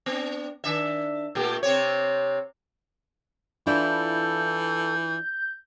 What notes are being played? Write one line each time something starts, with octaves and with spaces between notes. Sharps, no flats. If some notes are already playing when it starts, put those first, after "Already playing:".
B3 D4
D#3 D4 E5
A#2 A3 G4
C3 C4 C#5
E3 D4 E4 F4 A4 G6